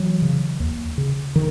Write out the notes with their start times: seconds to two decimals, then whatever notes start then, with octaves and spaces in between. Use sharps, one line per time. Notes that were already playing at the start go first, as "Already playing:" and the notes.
Already playing: E3 F#3
0.22 C#3
0.60 D#2
0.98 C#3
1.36 D#3